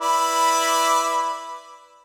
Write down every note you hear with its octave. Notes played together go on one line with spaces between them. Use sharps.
E4 B4 D5